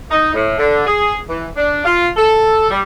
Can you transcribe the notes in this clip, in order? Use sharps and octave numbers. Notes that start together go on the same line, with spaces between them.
D#4
A2
D3
G#4
E3
D4
F4
A4
G3